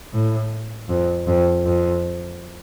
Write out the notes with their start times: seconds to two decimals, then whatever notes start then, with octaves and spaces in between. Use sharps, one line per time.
0.13 A2
0.89 F2
1.27 F2
1.65 F2